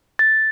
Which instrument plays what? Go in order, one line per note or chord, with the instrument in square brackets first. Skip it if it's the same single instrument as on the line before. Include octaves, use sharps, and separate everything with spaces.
[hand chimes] A6